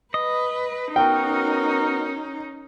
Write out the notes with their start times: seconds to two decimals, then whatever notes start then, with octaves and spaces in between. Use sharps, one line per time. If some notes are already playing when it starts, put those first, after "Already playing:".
0.14 B4 D#5
0.96 B3 C#4 D#4 F#4 A#4 G5